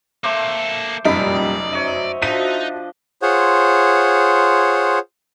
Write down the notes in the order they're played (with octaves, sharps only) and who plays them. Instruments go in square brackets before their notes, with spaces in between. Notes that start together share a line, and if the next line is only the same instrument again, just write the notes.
[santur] A3 C5 D6 [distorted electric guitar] A#3 A4
[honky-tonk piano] F1 F#2 D#4 [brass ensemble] A#2 G3 [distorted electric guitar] D5 [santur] B5
[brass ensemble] F#4 C5 E5 [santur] C#5 D#5
[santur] F3 D4 D#5 [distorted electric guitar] D#4 [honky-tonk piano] F#6 B6 D#7
[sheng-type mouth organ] F4 G#4 C5 C#5 F#5